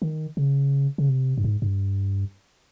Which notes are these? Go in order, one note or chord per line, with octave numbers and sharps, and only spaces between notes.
D#3
C#3
C#3
C3
G2
G#2
G2